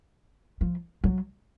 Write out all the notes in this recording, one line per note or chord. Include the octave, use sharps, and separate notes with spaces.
F3
F#3